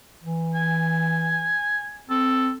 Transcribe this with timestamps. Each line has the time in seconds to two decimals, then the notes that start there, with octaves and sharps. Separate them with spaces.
0.24 E3
0.55 G#5
2.10 C4 A4